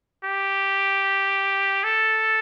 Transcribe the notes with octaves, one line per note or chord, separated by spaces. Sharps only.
G4
A4